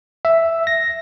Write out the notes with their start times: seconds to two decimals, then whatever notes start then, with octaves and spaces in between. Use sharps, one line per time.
0.25 E5
0.67 A#6